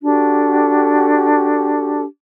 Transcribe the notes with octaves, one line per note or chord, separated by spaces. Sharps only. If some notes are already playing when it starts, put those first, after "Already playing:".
D4 F#4 G4 A4